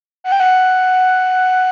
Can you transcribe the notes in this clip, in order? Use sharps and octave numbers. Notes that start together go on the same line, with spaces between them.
F#5
G5
F#5